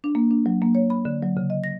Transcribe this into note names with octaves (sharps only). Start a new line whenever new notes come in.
D4
A#3
D4
F#3
A#3
C#5
B5
D3
F#3
C#3
D#5
A#6